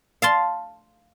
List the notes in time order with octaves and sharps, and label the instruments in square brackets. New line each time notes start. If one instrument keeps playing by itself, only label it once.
[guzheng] F5 A5 C6